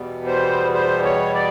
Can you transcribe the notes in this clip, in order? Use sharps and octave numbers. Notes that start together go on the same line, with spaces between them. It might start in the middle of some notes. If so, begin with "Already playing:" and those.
Already playing: E2 B2 G3 B3
C5
C5
C#5
D5